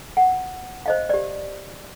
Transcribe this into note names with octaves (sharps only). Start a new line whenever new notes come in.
F#5
C5 D#5 F5
G4 D5